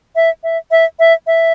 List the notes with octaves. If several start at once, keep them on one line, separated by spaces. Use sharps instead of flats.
E5
E5
E5
E5
E5